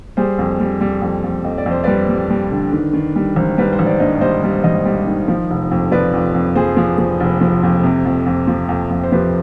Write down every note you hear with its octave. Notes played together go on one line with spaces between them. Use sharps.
G3 G#4 C5
F2
G3
G3
F2
F2
F2 D#5
D5
F2
C5
G3 B4 D5
G3
G3
D3
D#3
D#3
G3
G#1
G3 B4
C5
G#1
D5
G2 C5 D#5
G3 C5 D#5
G3
G#1 C5 D#5
G3
D#3
F3
F1
F2
F3 B4 D5
F2
F2
F3 G#4 C5
F3
F3
F1
F3
F2
C3
F2
F2
F3
F2
F2
C5
F3 G4 B4